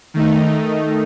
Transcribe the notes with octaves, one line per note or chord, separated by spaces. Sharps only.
D#3 A3 D#4